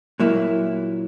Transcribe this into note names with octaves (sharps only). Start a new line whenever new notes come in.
A#2 F#3 A#3 E4